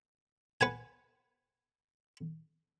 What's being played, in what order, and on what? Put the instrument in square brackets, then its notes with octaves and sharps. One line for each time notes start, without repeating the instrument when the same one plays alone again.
[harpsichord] B4 F#5 G#5